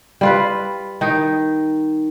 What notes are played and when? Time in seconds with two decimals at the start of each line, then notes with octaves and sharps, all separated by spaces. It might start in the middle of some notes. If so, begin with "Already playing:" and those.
0.21 G3 F4 B4
1.01 D#3 D#4